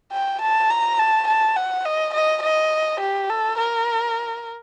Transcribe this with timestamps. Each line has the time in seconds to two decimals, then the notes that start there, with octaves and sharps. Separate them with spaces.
0.13 G5
0.42 A5
0.70 A#5
0.99 A5
1.28 A5
1.57 F#5
1.85 D#5
2.14 D#5
2.43 D#5
3.01 G4
3.30 A4
3.58 A#4